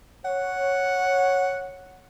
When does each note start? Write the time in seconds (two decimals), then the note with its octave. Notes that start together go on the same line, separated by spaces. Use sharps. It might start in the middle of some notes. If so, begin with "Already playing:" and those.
0.25 C#5 F#5